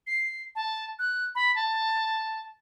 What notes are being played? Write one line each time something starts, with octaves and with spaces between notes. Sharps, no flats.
C7
A5
F#6
B5
A5